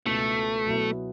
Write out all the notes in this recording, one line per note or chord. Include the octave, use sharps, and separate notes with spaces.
C#2 B2 A3 B3 E4
B2 F#3 B3 E4